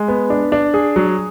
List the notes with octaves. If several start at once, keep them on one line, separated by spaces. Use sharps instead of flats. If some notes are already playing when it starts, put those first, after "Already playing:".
Already playing: G#3
B3
D4
D4
G#4
F#3